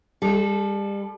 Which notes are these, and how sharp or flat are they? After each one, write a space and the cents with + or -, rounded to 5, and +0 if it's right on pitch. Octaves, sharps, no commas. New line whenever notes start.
G3 +35 A4 -20